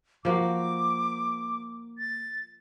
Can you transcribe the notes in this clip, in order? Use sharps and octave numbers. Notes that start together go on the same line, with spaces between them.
F3 A#3 F#4 D6
A6